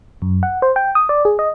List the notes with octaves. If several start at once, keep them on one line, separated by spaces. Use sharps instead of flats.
F#2
F#5
C5
G5
D#6
D5
G#4
D#5